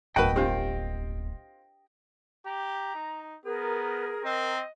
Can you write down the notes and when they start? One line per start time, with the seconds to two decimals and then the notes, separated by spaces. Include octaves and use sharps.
0.16 D1 G1 F#4 A#4 B4 D#5 G5 A5
0.36 C4 D4 F4 G4
2.46 G4 A#5
2.95 D#4
3.46 B3 G#4 A#4
4.24 C4 D#5